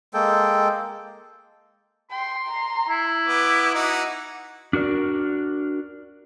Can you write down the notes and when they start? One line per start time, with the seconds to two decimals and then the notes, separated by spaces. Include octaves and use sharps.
0.14 G#3 A#3 A4 G5
2.11 G5 C6
2.48 A#5
2.89 E4
3.27 B3 D6
3.74 D#4 F#4
4.73 D4 F#4 A#4 D5